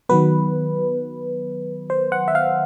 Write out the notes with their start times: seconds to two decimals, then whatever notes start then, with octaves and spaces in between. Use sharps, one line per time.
0.09 D#3 F#3 B3 B4
1.90 C5
2.12 F#5
2.28 E5
2.35 F5